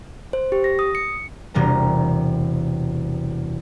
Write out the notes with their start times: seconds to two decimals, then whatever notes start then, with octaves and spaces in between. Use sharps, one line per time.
0.33 C5
0.52 G4
0.64 A#6
0.79 D#6
0.95 C#7
1.54 E1 C3 G3 A#4 A#5